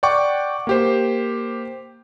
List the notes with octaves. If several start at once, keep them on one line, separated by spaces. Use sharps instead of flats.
D5 F#5 G5 C#6 D6
A#3 G4 C5